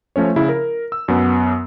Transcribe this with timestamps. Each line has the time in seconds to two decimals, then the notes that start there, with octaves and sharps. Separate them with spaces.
0.16 F3 A3 C#4 C#5
0.36 C#3 E4
0.49 A#4
0.92 E6
1.08 F#2 B3